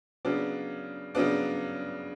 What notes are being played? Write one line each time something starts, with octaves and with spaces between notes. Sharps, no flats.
C#3 F#3 B3 D4
C#3 F#3 B3 D4